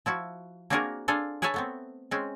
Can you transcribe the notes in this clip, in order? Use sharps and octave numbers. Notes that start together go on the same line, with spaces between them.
F3 E4 F#4
A#3 C4 D4 F#4 G#4 A#4
D4 F4 G#4 A4
G#4 B4 C#5 E5 G#5 A5
A3 B3 C4
G#3 C4 C#4